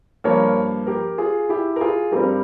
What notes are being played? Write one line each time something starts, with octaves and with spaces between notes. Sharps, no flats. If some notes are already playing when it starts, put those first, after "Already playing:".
G2 F3 A#3 A#4 C#5
G4 A#4
F4 G#4
E4 G4
A#4
F4 G#4
G2 G3 C4 G4 A#4